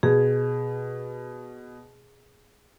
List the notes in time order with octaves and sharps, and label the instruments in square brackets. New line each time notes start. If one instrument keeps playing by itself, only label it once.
[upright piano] B2 [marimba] G#4